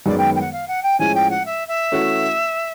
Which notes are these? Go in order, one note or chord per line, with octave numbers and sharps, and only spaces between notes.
F#2 D#3 G#3 B3 D5
G5
G5
F#5
F5
F#5
G5
A2 F3 G#3 C#4 G#5
G5
F#5
E5
E5
E3 A3 C#4 F#4